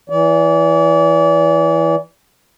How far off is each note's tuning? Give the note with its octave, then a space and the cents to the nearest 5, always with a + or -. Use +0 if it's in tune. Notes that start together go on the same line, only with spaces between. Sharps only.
E3 +0 D5 -35